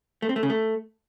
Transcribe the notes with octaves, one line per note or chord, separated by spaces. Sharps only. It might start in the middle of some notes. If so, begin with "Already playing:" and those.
A3
C4
A3
C#3
A3